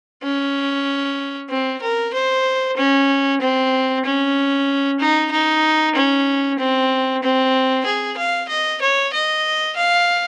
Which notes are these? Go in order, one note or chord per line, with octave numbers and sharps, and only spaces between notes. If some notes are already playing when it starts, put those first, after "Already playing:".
C#4
C4
A#4
C5
C#4
C4
C#4
D#4
D#4
C#4
C4
C4
G#4
F5
D#5
C#5
D#5
F5